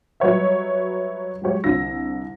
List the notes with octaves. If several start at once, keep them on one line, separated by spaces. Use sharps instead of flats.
F#3 G3 B4 C#5 D#5 E5
F#3 G#3 G4 C#5
C2 D3 E6 A#6